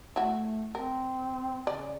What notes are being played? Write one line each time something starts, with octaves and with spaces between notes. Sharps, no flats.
A3 E4 F#4
C4 A#4
C#3 D5